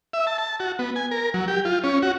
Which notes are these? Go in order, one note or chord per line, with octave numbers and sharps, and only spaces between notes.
E5
A5
A5
F#4
B3
G#5
A#4
F#3
G4
F4
C#4
F#4